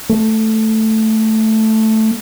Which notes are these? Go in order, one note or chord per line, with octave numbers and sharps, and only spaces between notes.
A3